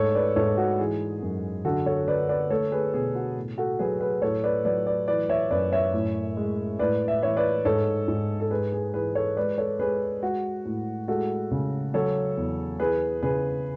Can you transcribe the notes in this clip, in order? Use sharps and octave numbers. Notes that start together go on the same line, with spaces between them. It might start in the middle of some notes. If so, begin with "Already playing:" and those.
Already playing: G#2 A3 A4 C#5
B4 D5
G#2 A4 C#5
F#4
E3 G#4
F#2
D3 F#4 A4
A4 C#5
D3 B4 D5
B4 D5
A3 A4 C#5
G#4 B4
B2 G#4
F#4
A2
F#4 A4
F#3 G#4 B4
G#4 B4
A2 A4 C#5
B4 D5
F#3 B4 D5
B4 D5
E3 B4 D5
C#5 E5
F#2 B4 D5
C#5 E5
A2
G#3
A2 B4 D5
E5
E3 C#5 E5
B4 D5
G#2 A4 C#5
G#2
A4
G#3 G#4 B4
G#4
E3 G#4 B4
A4 C#5
G#3 B4 D5
A4 C#5
G#3 G#4 B4
G#3 F#4
A2
G#3 F#4 A4
C#3
F#3 A4 C#5
E2
E3 G#4 B4
C#3 G#4 B4